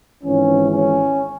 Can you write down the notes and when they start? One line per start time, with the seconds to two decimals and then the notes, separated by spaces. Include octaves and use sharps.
0.23 G#1 G#2 E3 C#4
0.72 C#4